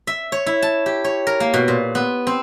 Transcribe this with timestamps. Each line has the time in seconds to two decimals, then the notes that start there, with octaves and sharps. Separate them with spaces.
0.07 E5
0.32 C#5
0.46 E4
0.62 A5
0.86 G4
1.04 C#5
1.27 A#4
1.40 A#3
1.54 B2
1.68 A#2
1.95 B3
2.27 C4